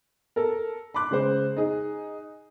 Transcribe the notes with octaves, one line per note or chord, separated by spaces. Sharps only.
A4 A#4
B5 C6 D6 F#6
C#3 G#3 C5
D#4 G#4